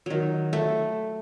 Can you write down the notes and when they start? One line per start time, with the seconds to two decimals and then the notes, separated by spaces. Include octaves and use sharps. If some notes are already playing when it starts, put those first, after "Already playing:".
0.06 D#3 F#3
0.53 A3